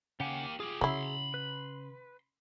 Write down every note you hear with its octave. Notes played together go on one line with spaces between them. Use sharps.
C#3 A#3 G4 F#5 G#5
F4 G4 G#4
C#3 F#3 E4 B5 C6
B4